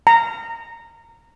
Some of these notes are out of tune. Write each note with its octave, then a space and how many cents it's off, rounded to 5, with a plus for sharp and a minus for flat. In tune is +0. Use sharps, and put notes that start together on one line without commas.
A#5 -15